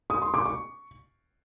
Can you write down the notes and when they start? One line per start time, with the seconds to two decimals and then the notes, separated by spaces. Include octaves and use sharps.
0.10 D#6
0.22 C6
0.34 D6
0.46 C#6